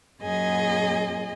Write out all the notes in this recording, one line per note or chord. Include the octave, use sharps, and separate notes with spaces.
F#2 A#2 G#4 D#5